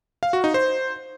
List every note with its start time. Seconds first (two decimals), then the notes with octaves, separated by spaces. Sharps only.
0.23 F5
0.33 F#4
0.44 D#4
0.54 C5